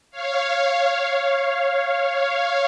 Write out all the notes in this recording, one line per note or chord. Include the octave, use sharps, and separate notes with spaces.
C#5 F5